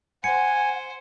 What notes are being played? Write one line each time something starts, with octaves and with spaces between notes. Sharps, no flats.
C5 F#5 G#5 C#7